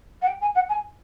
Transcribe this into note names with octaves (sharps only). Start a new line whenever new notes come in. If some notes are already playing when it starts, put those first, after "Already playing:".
F#5
G5
G#5
F#5
G#5